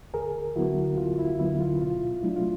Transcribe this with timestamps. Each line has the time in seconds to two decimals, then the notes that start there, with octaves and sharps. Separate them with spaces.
0.14 D2 G#4 A#4
0.56 D3 F#3 B3 E4 F#4
0.97 D2 F4
1.19 E4
1.39 D3 F#3 B3 E4
1.60 F4
1.82 B2 F4
2.23 F#3 A3 D4 E4
2.36 F4